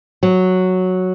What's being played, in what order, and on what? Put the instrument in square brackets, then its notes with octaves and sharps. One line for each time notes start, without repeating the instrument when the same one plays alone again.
[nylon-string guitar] F#3